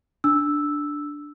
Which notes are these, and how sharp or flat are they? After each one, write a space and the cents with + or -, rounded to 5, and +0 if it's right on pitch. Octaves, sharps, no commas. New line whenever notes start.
D4 +0 E6 -5